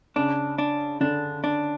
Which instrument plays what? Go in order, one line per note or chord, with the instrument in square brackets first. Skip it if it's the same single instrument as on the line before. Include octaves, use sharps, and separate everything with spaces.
[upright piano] C#3 [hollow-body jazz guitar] D4
[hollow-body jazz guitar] D4
[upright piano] D3 [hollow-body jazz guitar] D4
[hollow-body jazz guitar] D4